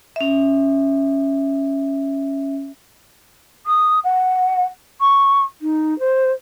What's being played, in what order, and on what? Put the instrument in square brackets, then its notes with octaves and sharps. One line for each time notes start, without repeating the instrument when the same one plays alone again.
[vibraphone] C#4 E5
[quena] D#6
F#5
C#6
D#4
C5